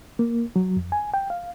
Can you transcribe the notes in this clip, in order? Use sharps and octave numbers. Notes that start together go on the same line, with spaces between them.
A#3
F#3
F2
G#5
G5
F5